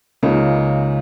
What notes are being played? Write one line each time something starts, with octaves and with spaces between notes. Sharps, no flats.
C#2 C#3 A#3 D#4